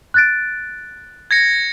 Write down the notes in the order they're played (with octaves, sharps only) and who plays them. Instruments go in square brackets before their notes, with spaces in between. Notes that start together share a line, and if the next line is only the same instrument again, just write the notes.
[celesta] F#6 A6 D7
[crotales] G#6 A#6 C#7